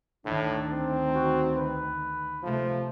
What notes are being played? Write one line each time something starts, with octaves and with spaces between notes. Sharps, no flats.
D2 A2 D#3 D4
C4
F#4
B4
C3 F3 A3